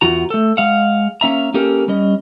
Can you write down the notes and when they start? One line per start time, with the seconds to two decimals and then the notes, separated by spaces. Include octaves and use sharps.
0.01 E2 F4 F#4 A#5
0.30 A3 A4
0.57 G#3 F5 F#5
1.21 A#3 C#4 E5 A#5
1.54 A#3 C#4 G4 A4 A#4
1.88 G3 C#4 D#5